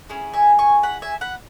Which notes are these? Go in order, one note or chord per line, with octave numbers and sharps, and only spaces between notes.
C#4 E4 G#4
E5 G#5
G#5 C#6
F#5 B5
E5 G#5
F#5 B5